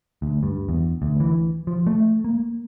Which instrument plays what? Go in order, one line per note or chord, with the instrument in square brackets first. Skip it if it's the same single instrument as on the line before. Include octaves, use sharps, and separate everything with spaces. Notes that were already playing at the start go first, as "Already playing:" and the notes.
[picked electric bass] D2
G2
E2
D2
E3
F3
A3
A#3